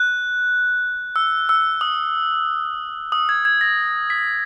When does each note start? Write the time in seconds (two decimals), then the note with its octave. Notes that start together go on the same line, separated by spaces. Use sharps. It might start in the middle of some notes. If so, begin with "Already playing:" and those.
Already playing: F#6
1.16 E6
1.49 E6
1.81 D#6
3.12 D#6
3.29 G#6
3.45 G#6
3.61 A#6
4.10 B6